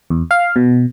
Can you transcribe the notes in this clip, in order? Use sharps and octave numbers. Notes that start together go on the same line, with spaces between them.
E2
F5
B2